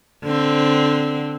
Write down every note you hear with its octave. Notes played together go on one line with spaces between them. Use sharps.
D3 C4